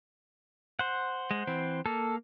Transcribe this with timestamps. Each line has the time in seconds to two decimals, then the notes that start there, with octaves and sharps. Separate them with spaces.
0.79 C5 F#5
1.31 G#3
1.47 E3 C4
1.86 A#3 A4